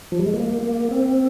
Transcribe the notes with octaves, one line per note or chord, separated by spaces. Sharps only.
F3
G3
G#3
A#3
A#3
C4